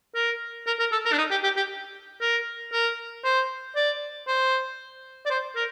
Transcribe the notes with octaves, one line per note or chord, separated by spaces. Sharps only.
A#4
A#4
A#4
A4
A#4
D4
D#4
G4
G4
G4
A#4
A#4
C5
D5
C5
D5
C5
A#4